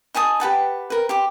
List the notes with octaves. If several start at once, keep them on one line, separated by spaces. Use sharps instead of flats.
D#4 G#5 A5 D#6
G4 B4 F#5 A5
A#4 B4
G4 C6 D6